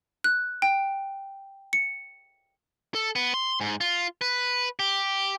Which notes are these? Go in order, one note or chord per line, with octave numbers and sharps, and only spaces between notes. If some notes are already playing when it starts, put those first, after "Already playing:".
F#6
G5
C#7
A4
B3
C6
G#2
F4
B4
G4